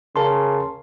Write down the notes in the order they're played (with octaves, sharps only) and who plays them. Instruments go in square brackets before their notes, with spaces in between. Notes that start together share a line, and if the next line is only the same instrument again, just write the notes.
[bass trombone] C#3 [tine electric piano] A#4 A5 C6